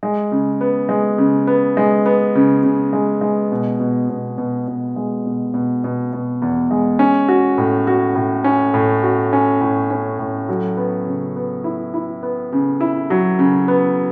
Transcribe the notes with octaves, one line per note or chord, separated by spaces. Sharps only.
G#3
C#3
B3
G#3
C#3
B3
G#3
B3
C#3
C#3
G#3
G#3
B2
B2
B2
B2
B2
G#3
B2
B2
B2
B2
E2
G#3
C#4
F#4
A2
F#4
A2
C#4
A2
F#4
C#4
A2
C#4
A2
F#3
B3
C#3
B3
E4
E4
B3
C#3
E4
F#3
C#3
B3